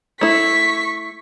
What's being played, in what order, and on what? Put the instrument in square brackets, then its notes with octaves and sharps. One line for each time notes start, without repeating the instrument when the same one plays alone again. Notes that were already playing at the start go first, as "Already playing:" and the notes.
[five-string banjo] A3 E4 [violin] C#6 B6